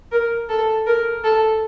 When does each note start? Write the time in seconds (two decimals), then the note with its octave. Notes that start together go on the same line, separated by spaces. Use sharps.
0.12 A#4
0.49 A4
0.86 A#4
1.24 A4